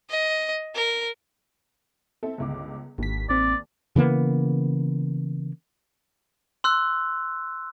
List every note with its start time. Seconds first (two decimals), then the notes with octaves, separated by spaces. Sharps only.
0.10 D#5
0.75 A#4
2.23 C4 A4 E5
2.38 G1 C#2 D6
2.98 G#1 D#2 B6
3.29 A1 C4 D5
3.96 C#3 E3 A#3 B3
6.64 C6 E6 F#6